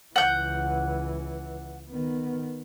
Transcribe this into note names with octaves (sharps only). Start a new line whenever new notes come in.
C#2 E3 F#5 G6
D#3 B3